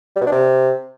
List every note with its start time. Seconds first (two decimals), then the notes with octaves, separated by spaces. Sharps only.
0.16 G3
0.21 B2
0.27 D4
0.32 C3